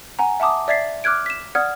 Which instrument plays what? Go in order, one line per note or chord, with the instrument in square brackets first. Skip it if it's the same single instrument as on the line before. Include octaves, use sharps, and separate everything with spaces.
[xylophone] F#5 G#5 A#5
E5 F#5 A5 D6 D#6
D5 E5 G#6 A6 B6 C7
D6 F6 F#6 G#6 D7
B6 E7
D5 F#5 D#6 F6 G#6